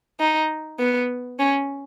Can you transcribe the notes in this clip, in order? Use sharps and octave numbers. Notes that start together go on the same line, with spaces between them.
D#4
B3
C#4